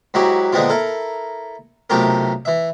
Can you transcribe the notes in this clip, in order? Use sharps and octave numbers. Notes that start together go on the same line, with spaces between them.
G#2 F#3 E4 F#4 G4
A#2 D3 G#3 B3 C4 F4
E4 A4 A#4
B1 C3 A3 F4 G4 A#4
E3 E5